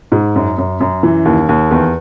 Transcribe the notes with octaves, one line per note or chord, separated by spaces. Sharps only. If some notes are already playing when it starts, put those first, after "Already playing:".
G#2
F#2
F#2
F#2
E3
D#2
D#2
E2